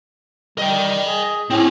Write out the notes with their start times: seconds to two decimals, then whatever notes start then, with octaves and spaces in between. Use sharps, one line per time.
0.58 G3 D#5 G5
1.04 G#4
1.50 A2 C4 C#4